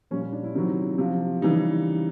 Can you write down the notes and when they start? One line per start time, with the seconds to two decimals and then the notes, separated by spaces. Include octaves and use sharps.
0.11 A#2 G3 C#4
0.21 C#4
0.33 D4
0.44 E4
0.55 C3 D#3 F#3
0.98 C3 F3
1.42 C#3 E3 G3 D#4